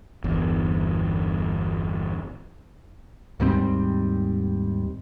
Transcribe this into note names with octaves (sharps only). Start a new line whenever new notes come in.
G1 E2
D#2 G#2 G3 C4